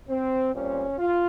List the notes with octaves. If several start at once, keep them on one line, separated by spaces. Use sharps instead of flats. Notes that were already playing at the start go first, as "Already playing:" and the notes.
C4
A#2 G3 C4 C#4
F4